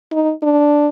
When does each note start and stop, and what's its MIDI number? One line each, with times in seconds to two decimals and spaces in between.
0.12 0.32 63
0.43 0.89 62